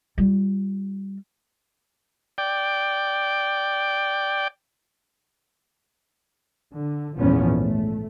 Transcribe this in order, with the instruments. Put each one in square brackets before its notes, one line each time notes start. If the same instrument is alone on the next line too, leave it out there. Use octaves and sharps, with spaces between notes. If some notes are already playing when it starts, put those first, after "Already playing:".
[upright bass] G3 F4
[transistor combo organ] D5 G5
[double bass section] D3
A#1 E2 G#2 F3 B3 C#4
A3